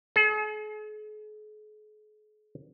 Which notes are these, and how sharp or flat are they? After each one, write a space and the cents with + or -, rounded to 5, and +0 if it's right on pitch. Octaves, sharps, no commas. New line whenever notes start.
G#4 +45